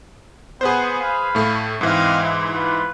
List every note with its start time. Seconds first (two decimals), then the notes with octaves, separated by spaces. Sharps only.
0.61 B3 G#4 B4 C5
0.99 F5 B5
1.35 A2 A3
1.81 G#2 E3 C4 D#5 F5
2.22 G#3 E4
2.53 F4 B4